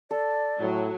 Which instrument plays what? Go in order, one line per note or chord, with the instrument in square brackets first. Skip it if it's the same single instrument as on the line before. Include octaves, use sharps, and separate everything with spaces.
[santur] A4 [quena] D5
[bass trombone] A2 [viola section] F#3